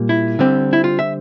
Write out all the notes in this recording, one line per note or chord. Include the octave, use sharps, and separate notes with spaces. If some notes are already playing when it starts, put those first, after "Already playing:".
Already playing: A#2 G3 A#3
E4
D3 G3 C4
E4
F4
E5